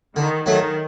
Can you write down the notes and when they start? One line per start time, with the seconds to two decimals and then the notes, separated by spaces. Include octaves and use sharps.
0.16 D3 D#3
0.46 D#3 F#3 A3